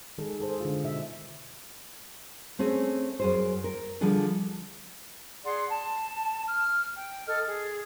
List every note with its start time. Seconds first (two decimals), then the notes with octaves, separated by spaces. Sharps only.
0.18 D#3 G#3 G#4 A4
0.40 G#4 A4 C5
0.60 D3 G#3 F4
0.84 B2 D#4 E5
2.59 A3 C4 C#4 G#4
3.20 F#2 G#4 C5
3.64 A#4
4.01 D3 F3 G3 D4 G#4 A4
5.45 G#4 D5 F#5 C6
5.69 A5
6.46 F6
6.95 G5
7.27 A4 D#5 F6
7.48 G#4